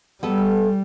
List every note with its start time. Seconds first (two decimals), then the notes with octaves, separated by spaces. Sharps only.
0.23 G3 B3 A4